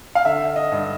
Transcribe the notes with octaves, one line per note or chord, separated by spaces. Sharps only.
F5
D3 E5
D#5
G2